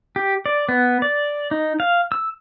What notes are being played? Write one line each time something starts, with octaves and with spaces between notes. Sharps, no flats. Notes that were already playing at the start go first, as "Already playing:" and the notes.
G4
D5
B3
D5
D#4
F5
E6